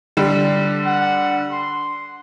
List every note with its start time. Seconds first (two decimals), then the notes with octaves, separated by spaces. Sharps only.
0.17 D3 G3
0.86 F#5
1.52 C6